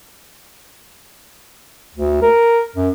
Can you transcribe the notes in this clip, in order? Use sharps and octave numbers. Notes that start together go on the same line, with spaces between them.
D2
A#4
F#2